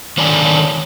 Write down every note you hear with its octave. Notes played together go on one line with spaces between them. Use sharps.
D3 D#3 C#5 D5 G#5 A5